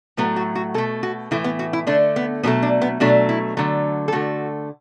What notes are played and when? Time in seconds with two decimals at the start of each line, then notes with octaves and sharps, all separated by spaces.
0.17 A2 F#3 A3 B3
0.36 F#4
0.55 F#4
0.74 B2 A4
0.78 A3
1.03 F#4
1.31 A2 E3 A3 E4
1.44 B3
1.59 F#4
1.73 E4
1.87 D3 A3 D4
2.16 B3
2.43 B2 F#3 A3 B3
2.62 D4
2.82 B3
3.00 B2 F#3 A3 D4
3.29 E4
3.57 D3 F#3 A3
4.08 A4
4.12 D3 A3 F#4